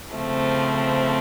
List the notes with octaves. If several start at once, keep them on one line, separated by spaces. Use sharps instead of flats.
C#3 F3 A3 C4